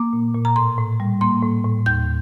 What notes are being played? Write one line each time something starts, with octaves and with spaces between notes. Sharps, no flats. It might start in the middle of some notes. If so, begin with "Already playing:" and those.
Already playing: A#3 D6
A#2
A#2
A#5
A2 C6
A2
G3
A#3 C6
A2
A2
D#2 G6